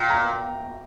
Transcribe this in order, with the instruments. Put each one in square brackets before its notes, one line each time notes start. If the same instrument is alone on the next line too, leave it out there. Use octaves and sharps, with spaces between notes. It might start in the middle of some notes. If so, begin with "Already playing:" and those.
Already playing: [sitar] A#2 [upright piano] G5
[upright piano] A#5